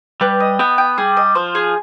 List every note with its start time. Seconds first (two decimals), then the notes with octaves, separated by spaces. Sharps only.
0.21 G3 B4
0.40 D#5
0.59 B3 G5
0.78 G5
0.98 G3 G#4
1.17 D#5
1.35 F3 C5
1.55 G#4